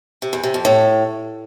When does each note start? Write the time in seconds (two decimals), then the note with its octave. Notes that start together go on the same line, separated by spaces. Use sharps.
0.22 C3
0.33 E2
0.43 C3
0.54 F2
0.65 A2